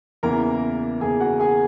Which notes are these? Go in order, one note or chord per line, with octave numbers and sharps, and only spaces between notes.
E2 C#3 E3 A#3 A#4 A#5
E2 C#3 E3 A#3 G#4 G#5
F#4 F#5
G#4 G#5